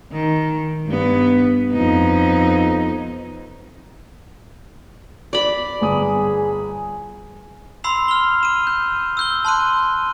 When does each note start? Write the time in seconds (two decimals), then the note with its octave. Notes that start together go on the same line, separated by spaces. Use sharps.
0.12 D#3
0.87 G2 B3
1.72 F2 B3 D#4
5.33 D5 B5
5.81 G1 G#4 D#6
7.84 B5 C6 E6 C7 F7
8.08 F6 G7
8.43 D#7 E7
8.67 G6
9.17 E6 G6 G7
9.45 A5 C6 F#6 D#7